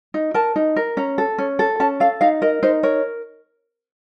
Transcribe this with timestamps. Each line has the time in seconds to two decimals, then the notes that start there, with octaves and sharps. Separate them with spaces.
0.14 D#4
0.34 A#4 A5
0.56 D#4
0.76 A#4
0.97 C#4 A#5
1.18 A4
1.38 C#4
1.59 A4
1.80 C#4 A5
2.00 A4 F5
2.21 D#4 F5
2.42 A#4 D#5
2.63 D#4 C5
2.83 A#4 C#5